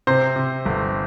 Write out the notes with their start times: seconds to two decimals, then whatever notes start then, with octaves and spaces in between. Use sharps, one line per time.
0.07 C3 C5
0.36 C3
0.65 G1